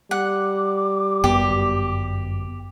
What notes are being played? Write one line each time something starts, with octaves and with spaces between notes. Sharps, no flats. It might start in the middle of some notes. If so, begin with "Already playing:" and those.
G3 F#5 D6
G1 F#2 B3 G4